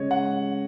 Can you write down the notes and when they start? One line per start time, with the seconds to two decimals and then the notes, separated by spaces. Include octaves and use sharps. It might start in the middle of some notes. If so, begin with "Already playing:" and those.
Already playing: C#3 G#3 C#5 D#5
0.11 F#5